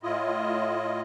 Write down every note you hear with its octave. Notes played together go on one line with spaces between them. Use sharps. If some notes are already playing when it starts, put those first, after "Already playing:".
A2 E4 F4 D#5